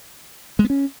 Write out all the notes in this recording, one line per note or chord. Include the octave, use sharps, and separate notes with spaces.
G#3
B3
C#4